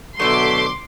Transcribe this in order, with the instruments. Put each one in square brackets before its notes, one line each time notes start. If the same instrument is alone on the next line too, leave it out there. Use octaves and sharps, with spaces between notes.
[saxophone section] B2 D3 F#3 [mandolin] A3 E5 [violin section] C6 D6